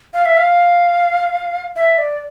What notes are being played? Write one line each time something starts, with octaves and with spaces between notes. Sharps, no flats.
F5
E5
F5
E5
D5